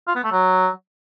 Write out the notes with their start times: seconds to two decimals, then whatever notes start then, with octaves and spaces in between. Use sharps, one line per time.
0.07 F4
0.15 B3
0.24 A3
0.32 F#3